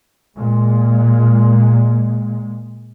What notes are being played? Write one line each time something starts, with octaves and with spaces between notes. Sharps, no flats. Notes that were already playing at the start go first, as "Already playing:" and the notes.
A#2 G#3